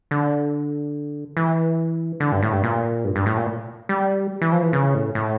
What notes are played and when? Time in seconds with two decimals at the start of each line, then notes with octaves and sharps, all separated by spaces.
0.11 D3
1.37 E3
2.20 D3
2.32 G2
2.42 A2
2.53 G2
2.64 A#2
3.04 G2
3.16 G2
3.26 A2
3.37 A#2
3.89 G3
4.42 E3
4.52 F3
4.63 E3
4.73 C#3
4.95 A2
5.15 A2